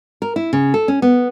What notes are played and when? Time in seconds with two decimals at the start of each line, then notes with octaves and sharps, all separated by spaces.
0.22 A#4
0.36 E4
0.53 C#3
0.74 A4
0.88 C#4
1.02 B3